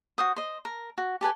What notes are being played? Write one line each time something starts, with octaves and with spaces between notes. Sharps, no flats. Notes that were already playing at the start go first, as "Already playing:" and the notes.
F#4 C5 D#6
C5 D#5
A#4
F#4
G4 A4 B4 G#5